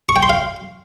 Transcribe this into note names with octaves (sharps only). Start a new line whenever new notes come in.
C#6
G5
C6
F5